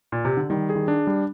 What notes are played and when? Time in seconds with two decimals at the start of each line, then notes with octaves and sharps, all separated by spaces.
0.12 A#2
0.25 C3
0.37 D3
0.50 D#3 G3
0.69 G#4
0.75 D#3
0.88 D4
1.07 G3